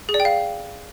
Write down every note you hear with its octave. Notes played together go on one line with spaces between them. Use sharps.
G#4
D5
G5
F5